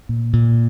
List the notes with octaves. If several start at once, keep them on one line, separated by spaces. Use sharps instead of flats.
A#2
A#2